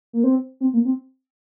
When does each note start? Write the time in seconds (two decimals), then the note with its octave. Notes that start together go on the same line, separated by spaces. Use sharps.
0.13 A#3
0.24 C4
0.61 C4
0.73 A#3
0.85 C4